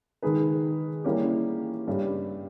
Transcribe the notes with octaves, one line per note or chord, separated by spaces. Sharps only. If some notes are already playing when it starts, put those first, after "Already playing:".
D#3 G#3 D#4 G#4 B4
E3 G3 A#3 C#4 G4
G2 G3 C#4 G4